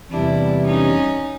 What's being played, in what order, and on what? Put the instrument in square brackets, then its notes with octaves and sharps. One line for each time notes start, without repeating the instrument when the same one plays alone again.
[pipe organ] E2 C3 E3 G3 [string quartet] D4 E4
[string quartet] C#4 D#4